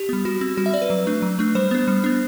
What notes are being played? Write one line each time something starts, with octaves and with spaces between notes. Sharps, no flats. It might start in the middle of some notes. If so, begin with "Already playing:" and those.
Already playing: G4
G3 B3
G3 F#4
C4
G3 F#4
E5
C4 D5
B4
F#3
A3 D4
F#3
A3 D4
G3 C5
B3 D4
G3
B3 D4